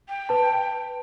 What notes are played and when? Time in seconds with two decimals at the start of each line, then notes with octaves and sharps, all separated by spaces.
0.09 G5
0.29 B4 A5